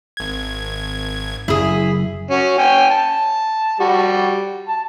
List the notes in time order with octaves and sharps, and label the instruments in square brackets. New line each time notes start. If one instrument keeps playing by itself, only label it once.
[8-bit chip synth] G#1 G#6
[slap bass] F#1 F#2 F#3 [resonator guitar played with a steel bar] E4 G#4
[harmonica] C#4 F#4
C#4 G5 G#5
A5
G3 F#4
A5